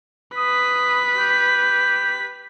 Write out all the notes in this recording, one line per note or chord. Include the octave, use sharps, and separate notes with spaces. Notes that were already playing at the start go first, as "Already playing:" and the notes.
B4 D#6 B6
G4